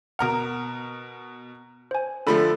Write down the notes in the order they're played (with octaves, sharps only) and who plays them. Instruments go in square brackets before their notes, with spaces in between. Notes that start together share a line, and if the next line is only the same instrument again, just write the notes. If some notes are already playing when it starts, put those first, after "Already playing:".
[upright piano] B2 A#4 F6 [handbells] F#5 A#5 D#6
[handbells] C5 G#5
[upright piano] D3 F3 A3 [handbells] A4 B5